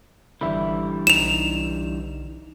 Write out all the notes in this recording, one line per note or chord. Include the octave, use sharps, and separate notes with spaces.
G#1 D3 E3 G3 E5 B5
B1 D#4 E7 F7